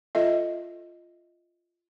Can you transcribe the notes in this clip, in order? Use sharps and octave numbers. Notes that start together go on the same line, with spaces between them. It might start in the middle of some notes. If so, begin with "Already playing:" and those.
F4 A4 D#5 E5